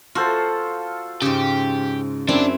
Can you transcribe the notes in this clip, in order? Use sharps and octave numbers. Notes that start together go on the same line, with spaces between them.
F4 F#4 A4 C5
G#2 C#3 G4
F#2 C4 D4 E4